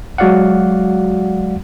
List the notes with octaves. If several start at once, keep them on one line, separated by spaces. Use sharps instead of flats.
F#3 G#3 F#4 D5 F5 F#5